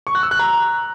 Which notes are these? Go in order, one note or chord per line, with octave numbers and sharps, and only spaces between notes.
C#6
F#6
E6
F#6
A#5